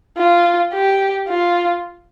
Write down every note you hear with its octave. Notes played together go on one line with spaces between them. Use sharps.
F4
G4
F4